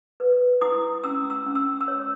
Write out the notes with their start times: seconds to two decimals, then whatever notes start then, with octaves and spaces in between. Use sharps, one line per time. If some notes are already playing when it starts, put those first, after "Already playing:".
0.20 B4
0.61 E4 D#6
1.04 C#4 E6
1.30 E6
1.46 C#4
1.55 E6
1.81 E6
1.88 C#5